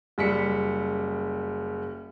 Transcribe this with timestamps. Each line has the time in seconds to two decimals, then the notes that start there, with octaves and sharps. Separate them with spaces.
0.18 F#1 G3 B6 C#7